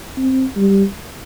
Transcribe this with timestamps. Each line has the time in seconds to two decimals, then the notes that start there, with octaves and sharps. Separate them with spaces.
0.17 C4
0.56 G3